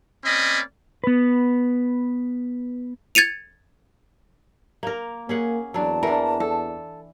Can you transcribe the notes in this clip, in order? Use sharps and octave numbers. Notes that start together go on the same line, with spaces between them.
A#3 C4 C#4 D5 D#5 B5
B3 B4
G#6 A6 C#7 D#7 F7
A#3 A#4
A#3 C#4 G#4 F#5
E2 F#3 D4 A5
E3 D4 A#4
A4